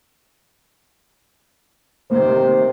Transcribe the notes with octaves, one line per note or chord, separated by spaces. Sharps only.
C3 D#3 A#3 C5